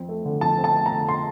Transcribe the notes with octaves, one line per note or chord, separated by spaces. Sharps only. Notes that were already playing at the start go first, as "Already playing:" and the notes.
Already playing: F2 C4
A3
D3
F2 A5
C4
A5
A3
A#5
D3
C6